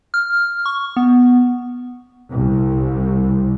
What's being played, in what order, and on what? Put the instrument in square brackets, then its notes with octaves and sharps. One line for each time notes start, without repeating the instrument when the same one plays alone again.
[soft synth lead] F6
C#6
B3
[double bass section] C2